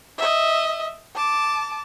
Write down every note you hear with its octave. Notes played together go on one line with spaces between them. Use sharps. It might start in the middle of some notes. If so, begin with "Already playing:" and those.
D#5 E5
A5 D6